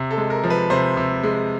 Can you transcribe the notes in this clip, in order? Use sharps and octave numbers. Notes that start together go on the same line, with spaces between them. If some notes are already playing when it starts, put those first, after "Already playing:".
Already playing: C3
A4
G#3
A#4
F3
B4
C3 C5
C3
G#3